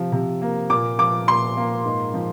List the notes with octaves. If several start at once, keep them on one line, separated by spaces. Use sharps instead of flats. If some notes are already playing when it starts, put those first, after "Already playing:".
Already playing: C3 F3
C3
A#3
A#2 D6
F3 D6
A#2 C6
A#3
G#2
F3